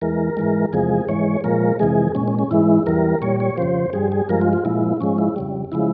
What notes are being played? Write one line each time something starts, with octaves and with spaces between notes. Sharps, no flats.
E2 E3 G#3 A#4
G#2 E3 G#3
E2 C3 F3 G#3 G#4
G#2 E3 G#3 C#5
A#2 F3 G#3 A#4
F2 C3 E3 G#3 G#4
A#2 G#3 C#4
C#4
C#4
G#2 E3 G#3 E4
E2 E3 G3 A#4
A#2 G3 C#5
C#5
F2 C#3 F3 C5
G2 G3 G#4
G#4
G2 F3 G#3 A#4
F4
F4
A#2 F3 G#3 E4
G#2 F3 G#3 C#4
E4
F2 C#3 G3
C#3 F3 G#3 E4